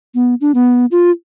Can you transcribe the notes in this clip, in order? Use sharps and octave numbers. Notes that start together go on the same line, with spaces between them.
B3
D4
B3
F4